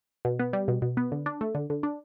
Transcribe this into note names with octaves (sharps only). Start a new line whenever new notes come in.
B2
B3
G3
B2
B2
B3
D3
D4
A3
D3
D3
D4